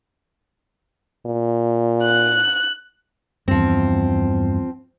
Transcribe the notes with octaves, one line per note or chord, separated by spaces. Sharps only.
A#2
F#6
E2 G2 F3 C4